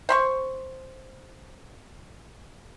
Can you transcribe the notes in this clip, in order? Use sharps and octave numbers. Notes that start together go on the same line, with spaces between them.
C5 B5 C#6